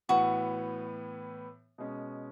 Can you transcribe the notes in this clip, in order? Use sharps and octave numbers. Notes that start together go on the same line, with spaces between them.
A2 E3 B3 F#4
B2 G#3 C#4